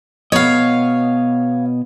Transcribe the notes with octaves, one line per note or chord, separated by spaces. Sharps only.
B2 B3 C#5 D#5 F5